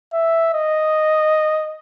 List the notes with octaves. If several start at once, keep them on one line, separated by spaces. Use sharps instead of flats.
E5
D#5